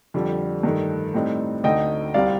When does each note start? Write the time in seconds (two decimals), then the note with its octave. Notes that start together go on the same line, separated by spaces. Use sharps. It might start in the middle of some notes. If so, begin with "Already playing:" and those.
0.14 F2 D3 G3
0.63 G2 D#3 A3
1.14 A2 G3 C4 D#4
1.64 D2 D3 A3 D#4 D#5 G5
2.14 C2 C3 G3 C4 D5 F5